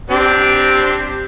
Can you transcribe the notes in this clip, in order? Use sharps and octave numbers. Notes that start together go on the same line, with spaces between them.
C4 D4 G4